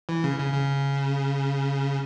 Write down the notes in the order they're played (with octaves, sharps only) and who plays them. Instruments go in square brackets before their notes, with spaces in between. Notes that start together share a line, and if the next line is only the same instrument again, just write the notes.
[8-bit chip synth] E3
C#3
C#3
C#3